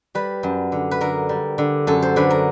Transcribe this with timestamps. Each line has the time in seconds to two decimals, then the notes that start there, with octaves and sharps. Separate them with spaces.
0.15 G3 B4
0.43 F#2
0.72 D3
0.91 B4
1.01 D3 A#4
1.29 G3
1.58 D3
1.87 F#2 A4
2.02 C5
2.16 D3 B4
2.30 A#4